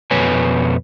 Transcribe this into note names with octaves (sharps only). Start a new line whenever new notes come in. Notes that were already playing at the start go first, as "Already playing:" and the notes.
F2 B2 B4 C#5 G#5